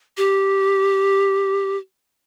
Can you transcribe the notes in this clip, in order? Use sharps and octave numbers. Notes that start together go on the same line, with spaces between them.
G4